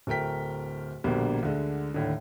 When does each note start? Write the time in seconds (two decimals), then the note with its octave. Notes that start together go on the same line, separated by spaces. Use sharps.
0.07 D1 A3 A#4 G5 B6
1.04 A#1 B2 D3 G3 A#3
1.43 D2 D3 G#3
1.94 D#2 A2 D3